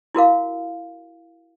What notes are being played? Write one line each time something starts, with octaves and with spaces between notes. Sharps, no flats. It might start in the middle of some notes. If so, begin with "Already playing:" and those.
E4 F#4 A#4 F5